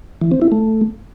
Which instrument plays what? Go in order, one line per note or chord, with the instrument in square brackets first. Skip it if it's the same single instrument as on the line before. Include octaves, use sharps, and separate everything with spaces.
[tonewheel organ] E3
C4
E4
A3